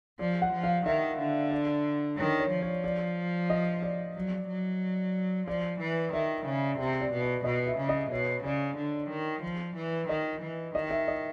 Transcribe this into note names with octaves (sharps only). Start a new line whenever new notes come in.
F3 D5
F#5
F3
F5
D#3 E5
D3
D5
D#3 C#5
C#5
F3
C#5
D5
D#5
D5
F#3
F#3
F3 D5
E3
D#3 E5
C#3
C3 E5
D5
B2
D5
B2 D#5
E5
C#3
D#5
B2 C#5
C#3 D5
D3
D#3
F3
E3
D#3 D#5
E3
D#3 D#5
E5
D#5